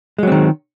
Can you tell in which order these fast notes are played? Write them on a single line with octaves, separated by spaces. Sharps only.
G#3 F#3 C4 D#3